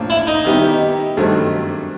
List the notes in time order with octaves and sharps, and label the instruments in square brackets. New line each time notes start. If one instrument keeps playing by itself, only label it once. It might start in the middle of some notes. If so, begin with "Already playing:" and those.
Already playing: [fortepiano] A2 F3 A#3 D4 F4
[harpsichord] E4
D#4
[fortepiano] D#3 G3 B3 E4 G4
G2 D#3 F#3 A3 C4